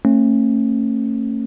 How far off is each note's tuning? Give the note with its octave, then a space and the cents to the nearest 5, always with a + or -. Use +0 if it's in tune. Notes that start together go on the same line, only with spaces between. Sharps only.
A3 +30 C#4 -35